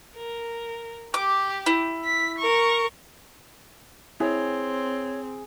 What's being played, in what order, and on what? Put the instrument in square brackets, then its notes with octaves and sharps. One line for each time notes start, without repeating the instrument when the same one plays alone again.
[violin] A#4
[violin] G4 [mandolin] D6
[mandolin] E4
[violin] B6
A#4 C#6
[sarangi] C4 [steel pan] E4 [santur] G#4 [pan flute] C#5